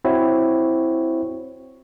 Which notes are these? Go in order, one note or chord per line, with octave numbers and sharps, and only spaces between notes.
C4 E4 F#4 C#5